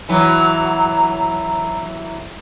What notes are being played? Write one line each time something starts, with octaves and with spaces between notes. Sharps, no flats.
E3 F#3